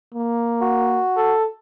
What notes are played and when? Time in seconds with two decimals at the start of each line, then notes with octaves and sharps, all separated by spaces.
0.14 A#3
0.61 F#4
1.17 A4